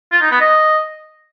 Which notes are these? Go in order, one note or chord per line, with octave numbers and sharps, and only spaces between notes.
F4
D#4
B3
D#5